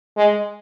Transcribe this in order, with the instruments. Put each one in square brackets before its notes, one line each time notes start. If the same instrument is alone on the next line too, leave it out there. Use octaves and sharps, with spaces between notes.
[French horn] G#3